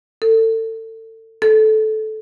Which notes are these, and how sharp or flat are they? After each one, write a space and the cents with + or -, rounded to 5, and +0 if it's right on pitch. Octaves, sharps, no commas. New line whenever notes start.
A4 +30
A4 -15